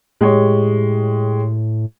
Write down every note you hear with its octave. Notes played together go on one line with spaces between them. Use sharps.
A2 G#3 G4 C#5